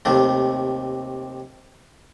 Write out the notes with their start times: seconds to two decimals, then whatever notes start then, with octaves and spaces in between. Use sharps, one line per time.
0.05 D#2 C3 A3